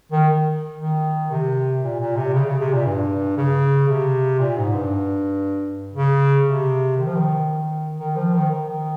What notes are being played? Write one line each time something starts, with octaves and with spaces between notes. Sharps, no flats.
D#3
D#3
C3
A#2
A#2
C3
C#3
C#3
C3
A#2
G2
C#3
C3
A#2
G#2
G2
C#3
C3
D#3
F3
D#3
D#3
F3
D#3
D#3